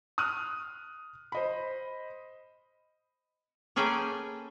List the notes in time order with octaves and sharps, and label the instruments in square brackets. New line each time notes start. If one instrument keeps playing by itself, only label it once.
[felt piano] D#6 F6 F#6 D#7
C5 D#5 B5
[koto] A#3 C#4 G#4 A4 B4 G5